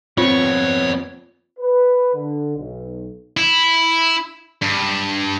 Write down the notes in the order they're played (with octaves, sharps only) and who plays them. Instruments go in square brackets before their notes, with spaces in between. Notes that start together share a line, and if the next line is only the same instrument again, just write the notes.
[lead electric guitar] F2 B3 [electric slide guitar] C4 [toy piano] F4 [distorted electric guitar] C#5
[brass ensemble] B4
D3
B1
[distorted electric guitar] E4
G2